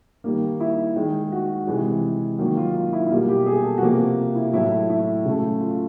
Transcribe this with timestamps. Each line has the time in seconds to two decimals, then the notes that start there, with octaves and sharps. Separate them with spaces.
0.24 D#3 G3 A#3
0.60 E4
0.96 D#3 G#3
1.32 F#4
1.67 C3 E3 G#3
2.38 D#3 F#3 A#3
2.57 F4
2.74 F4
2.93 E4
3.06 E4
3.10 B2 G3 A#3 F4
3.28 G4
3.46 G#4
3.64 A4
3.78 F#4
3.82 C3 F3 A#3 G4
4.35 E4
4.53 A2 F#3 A3 E4
4.90 E4
5.25 C#3 F#3 A3
5.60 F4